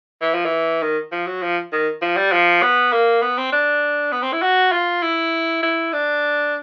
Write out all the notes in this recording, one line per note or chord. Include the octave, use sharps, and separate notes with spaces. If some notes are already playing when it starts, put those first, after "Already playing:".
E3
F3
E3
D#3
F3
F#3
F3
D#3
F3
G3
F3
B3
A#3
B3
C4
D4
B3
C4
E4
F#4
F4
E4
E4
D4